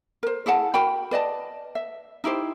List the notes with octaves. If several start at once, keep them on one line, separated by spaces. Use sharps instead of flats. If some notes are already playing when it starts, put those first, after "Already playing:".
A#4 C5
E4 G#4 F#5 A5
F#4 A#4 G5 B5
B4 D5 D#5 A5
E5
D#4 E4 G4 C5